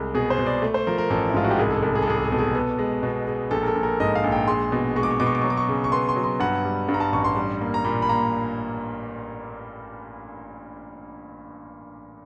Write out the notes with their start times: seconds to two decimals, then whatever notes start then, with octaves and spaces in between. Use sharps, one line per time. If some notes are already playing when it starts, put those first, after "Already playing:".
Already playing: C2 G#3
0.14 B2 G#4
0.30 C5
0.38 B2
0.46 D5
0.62 A3
0.74 C5
0.87 F3 A#4
0.98 A#4
1.10 A1 A4
1.30 E4
1.34 G#2 F4
1.44 F#4
1.51 G4
1.58 C2 G#4
1.70 A4
1.82 C2 A4
1.95 G#4
2.02 A4
2.07 C2 G#4
2.17 A4
2.24 G#4
2.31 B2 A4
2.38 G#4
2.54 B3 A4
2.79 G#3
3.03 B2
3.27 G#3
3.51 A#1 A4
3.62 A#4
3.68 A4
3.75 A#1
3.83 A#4
4.00 G#2 D#5
4.15 F5
4.24 A#1
4.32 G5
4.48 G#3 C6
4.72 B2
4.96 G#3 C#6
5.03 D6
5.11 C#6
5.20 B2 D6
5.27 C#6
5.35 D6
5.42 F#3 C#6
5.50 D6
5.57 C#6
5.69 C#3
5.84 C#6
5.92 B3 C6
6.09 C6
6.16 F#3
6.24 C6
6.40 G2 F#5
6.65 G3
6.88 G2
6.94 A#5
7.00 A5
7.12 A1 C#6
7.24 C6
7.36 G3
7.61 A#3
7.74 A#5
7.84 A#2 B5
8.02 B5
8.09 A#3 A#5